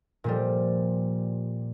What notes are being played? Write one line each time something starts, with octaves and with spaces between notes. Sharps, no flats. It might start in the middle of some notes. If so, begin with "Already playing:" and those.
A#2 F3 G3